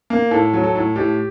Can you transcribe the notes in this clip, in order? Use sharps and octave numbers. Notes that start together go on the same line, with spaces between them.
A#3
A2 A4
F#3
A4
A2
A2 G4